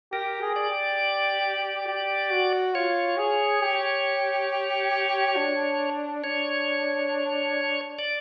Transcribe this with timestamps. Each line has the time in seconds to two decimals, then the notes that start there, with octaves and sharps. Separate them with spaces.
0.12 G4 A#4
0.41 G#4
0.56 D5
0.70 G4
1.87 G4
2.31 F#4
2.74 F4 C#5
3.18 G#4
3.62 G4
5.36 D4
6.24 D4 C#5
7.99 D5